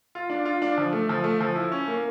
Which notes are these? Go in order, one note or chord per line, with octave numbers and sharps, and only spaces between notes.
F4
D4
F4
D4
F3
A3
F3
A3
F3
E4
C#4
A#3